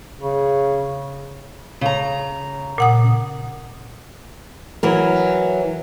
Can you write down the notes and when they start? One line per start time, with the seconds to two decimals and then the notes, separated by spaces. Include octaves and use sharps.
0.19 C#3
1.81 C#3 A#5
2.78 A#2 F#5 D#6
4.83 E3 F#3 A#4